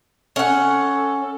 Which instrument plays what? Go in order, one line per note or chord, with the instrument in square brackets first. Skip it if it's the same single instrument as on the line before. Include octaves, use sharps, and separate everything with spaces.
[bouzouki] C#4 F#5 [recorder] A4